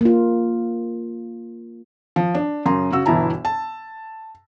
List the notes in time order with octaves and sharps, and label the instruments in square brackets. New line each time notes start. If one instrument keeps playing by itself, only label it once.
[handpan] A#3 F4
[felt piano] F3
D4
F#2 C#3 A#5 C6
C#3 F#4 E6
G1 B2 E3 E4 A5 A#5
A5